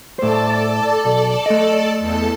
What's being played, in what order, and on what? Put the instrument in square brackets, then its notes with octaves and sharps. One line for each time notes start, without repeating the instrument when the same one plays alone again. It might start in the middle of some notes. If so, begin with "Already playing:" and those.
[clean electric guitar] A2 C5 [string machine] A4 D5 A5
[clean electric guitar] B1
A3 D#5
[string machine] E2 A4 A5